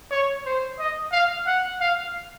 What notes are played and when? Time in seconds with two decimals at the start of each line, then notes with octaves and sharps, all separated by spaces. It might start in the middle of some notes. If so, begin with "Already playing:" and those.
0.11 C#5
0.45 C5
0.79 D#5
1.12 F5
1.47 F#5
1.80 F5